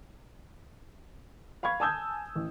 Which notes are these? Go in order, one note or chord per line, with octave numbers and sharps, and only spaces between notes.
F5 B5 C#6 G#6
G#5 A5 D#6 E6 G6 G#6
A1